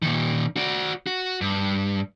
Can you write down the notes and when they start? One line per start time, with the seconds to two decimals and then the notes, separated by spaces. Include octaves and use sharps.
0.02 A#2 D#3
0.57 F#4 D5
1.07 F#4
1.41 G2